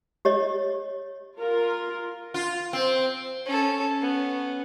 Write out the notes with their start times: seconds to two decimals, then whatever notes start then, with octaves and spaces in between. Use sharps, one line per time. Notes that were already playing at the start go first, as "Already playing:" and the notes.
0.25 G4 C#5 D#5
1.39 F4 A#4
2.34 F4
2.73 C4
3.46 C#4 A4
4.01 B3 C#4